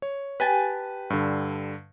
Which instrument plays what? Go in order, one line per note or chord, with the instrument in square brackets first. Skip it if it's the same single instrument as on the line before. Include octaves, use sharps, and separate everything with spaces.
[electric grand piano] C#5
[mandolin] G4 G#5 A5 [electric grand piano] B4
[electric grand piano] G2 D3